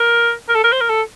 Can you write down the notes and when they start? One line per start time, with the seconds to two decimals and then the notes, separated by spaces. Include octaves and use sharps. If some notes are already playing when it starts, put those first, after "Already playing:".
Already playing: A#4
0.49 A#4
0.55 A4
0.64 A#4
0.72 C5
0.81 A#4
0.90 A4